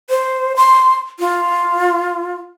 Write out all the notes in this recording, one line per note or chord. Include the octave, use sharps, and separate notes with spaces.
C5
C6
F4